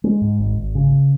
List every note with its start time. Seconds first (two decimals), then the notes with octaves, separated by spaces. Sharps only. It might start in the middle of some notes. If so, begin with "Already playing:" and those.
0.04 G#3
0.21 G#2
0.39 G#1
0.57 G#1
0.75 C#3